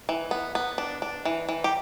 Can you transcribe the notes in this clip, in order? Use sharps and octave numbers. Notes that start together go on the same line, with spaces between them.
E3
B3
B3
D4
D4
E3
E3
G4